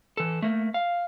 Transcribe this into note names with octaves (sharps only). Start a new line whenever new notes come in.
E3 A4
A3 A#3
F5